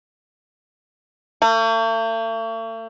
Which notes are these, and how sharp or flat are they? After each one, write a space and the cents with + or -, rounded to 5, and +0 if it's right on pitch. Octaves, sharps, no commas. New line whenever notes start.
A3 +45